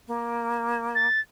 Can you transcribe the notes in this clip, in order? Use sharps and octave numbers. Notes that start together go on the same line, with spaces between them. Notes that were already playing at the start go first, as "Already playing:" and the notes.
A#3
A6